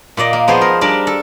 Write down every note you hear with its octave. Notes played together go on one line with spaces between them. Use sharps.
A#2 A#3 D5 D#5
A#3
F3 B3 G#4 C5
A#4
G3 D4 A#4 D5
A4